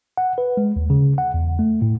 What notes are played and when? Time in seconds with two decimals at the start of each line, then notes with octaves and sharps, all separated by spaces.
0.17 F#5
0.38 B4
0.57 G#3
0.76 D#2
0.90 C#3
1.18 F#5
1.34 E2
1.59 A3
1.82 A2